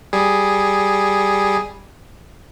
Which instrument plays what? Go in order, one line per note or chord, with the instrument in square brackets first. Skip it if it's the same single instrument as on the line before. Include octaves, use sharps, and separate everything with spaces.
[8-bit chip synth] G3 G#4